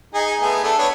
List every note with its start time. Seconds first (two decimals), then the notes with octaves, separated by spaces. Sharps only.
0.14 D#4 G#4
0.40 A3 B3 G#4
0.63 A3 D4 A4
0.78 B3 D4 C#5